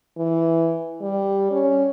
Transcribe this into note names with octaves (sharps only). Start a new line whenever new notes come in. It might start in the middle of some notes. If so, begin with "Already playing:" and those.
E3
G3
C#4